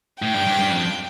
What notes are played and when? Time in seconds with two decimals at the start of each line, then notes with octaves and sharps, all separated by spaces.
0.22 A2 G5
0.34 G2
0.47 G2
0.59 G2
0.70 F2